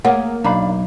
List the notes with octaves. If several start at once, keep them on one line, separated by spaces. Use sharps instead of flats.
A3 A#3 G#4 C#5 F#5
B1 D4 F5 A#5 B5